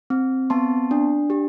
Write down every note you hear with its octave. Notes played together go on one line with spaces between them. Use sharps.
C4
B3 A5 C6
D4
G4